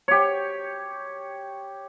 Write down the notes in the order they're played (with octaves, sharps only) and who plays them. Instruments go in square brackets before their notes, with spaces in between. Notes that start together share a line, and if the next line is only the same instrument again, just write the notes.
[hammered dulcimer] G4 C#5